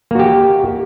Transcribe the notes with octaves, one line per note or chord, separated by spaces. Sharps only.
A#3 F#4 G4